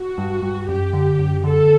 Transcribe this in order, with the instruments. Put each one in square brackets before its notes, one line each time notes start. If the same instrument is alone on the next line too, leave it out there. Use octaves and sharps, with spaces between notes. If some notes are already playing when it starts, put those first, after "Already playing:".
Already playing: [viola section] F#4
[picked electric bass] G2
G2
[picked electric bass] F#2 [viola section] G4
[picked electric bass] D3
F#2
[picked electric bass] D3 [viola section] A4